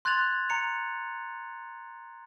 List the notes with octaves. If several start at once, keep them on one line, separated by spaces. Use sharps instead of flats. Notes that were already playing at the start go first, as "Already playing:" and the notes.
C6 F#6 G#6 A6 F7 F#7
A#5 C#7 F7